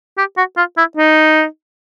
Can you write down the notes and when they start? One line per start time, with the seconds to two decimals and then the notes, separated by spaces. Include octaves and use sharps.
0.18 G4
0.37 F#4
0.57 F4
0.78 E4
0.97 D#4